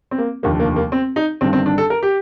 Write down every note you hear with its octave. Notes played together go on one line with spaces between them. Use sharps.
C4
A#3
F1 D#2 D3 F3 A#3
A#3
A#3
C4
D#4
G1 G2 D#3 C4
C4
D4
A4
A#4
G4